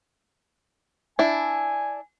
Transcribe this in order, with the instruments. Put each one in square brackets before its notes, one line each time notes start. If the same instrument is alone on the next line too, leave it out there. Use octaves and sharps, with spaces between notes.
[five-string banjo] D4 E4 [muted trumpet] G#5